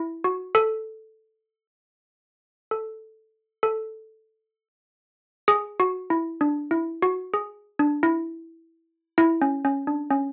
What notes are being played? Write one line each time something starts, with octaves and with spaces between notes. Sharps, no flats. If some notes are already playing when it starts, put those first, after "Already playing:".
Already playing: E4
F#4
A4
A4
A4
G#4
F#4
E4
D4
E4
F#4
G#4
D4
E4
E4
C#4
C#4
D4
C#4